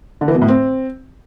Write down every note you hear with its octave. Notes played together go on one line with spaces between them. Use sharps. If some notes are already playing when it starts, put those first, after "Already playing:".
D3
E3
B2
A2
C4